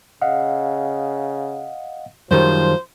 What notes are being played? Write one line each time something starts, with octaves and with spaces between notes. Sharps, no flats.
C#3 D#5 F5 F#5
F#2 D#3 F3 G3 C5